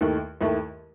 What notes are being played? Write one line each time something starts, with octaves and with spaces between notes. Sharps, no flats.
D#2 D#3 A3 E4
D#2 D#3 A3 E4